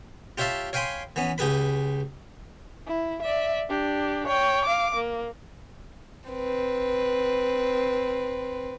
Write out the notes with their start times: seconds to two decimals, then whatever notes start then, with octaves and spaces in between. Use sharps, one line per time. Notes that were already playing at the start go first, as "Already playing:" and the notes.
0.38 F4 G4 C#5 E5 F5 A5
0.73 C#5 F5 G5 G#5 B5 C6
1.16 E3 B3 C#4
1.38 C#2 G4 G#4 B4 B5
2.88 E4
3.22 D5 E5
3.69 D4 G4
4.27 C#5 G5
4.65 F5 D6
4.96 A#3
6.30 C4 B4